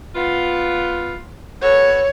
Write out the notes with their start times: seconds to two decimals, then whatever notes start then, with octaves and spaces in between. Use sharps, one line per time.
0.15 B3 F4
1.62 B3 F#4 A4 C#5